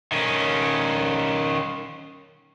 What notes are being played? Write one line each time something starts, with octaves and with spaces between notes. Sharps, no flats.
D#3 C#4